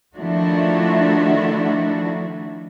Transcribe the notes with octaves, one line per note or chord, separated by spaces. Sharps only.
D#3 F3 A3 D4 E4 F#4